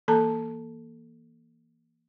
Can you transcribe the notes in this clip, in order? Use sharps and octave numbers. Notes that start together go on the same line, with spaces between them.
E3 A#3 A4 A5 A#5